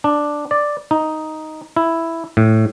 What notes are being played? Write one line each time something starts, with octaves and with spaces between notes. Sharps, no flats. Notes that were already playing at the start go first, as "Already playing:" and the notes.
D4
D5
D#4
E4
A2